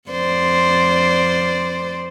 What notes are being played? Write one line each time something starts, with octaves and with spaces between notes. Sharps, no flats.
F2 C5 D5